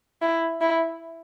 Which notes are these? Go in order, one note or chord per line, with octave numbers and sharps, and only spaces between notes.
E4
E4